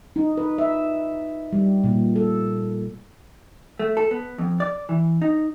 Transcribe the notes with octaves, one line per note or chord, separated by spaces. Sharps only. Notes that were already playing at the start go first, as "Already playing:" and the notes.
D#4
B4
E5
G3
A#2
A4
A3
A4
B3
F2
D5
E3
D#4